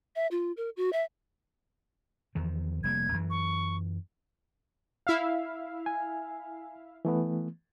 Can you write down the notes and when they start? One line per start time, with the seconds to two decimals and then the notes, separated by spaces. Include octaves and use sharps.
0.16 E5
0.31 F4
0.57 A#4
0.77 F#4
0.93 E5
2.35 E2 D#3 F3
2.84 F1 G3 A#3 G#6
3.12 F#2 E3
3.30 C#6
5.07 E4 E5 F5
5.86 G#5
7.05 E3 A3 B3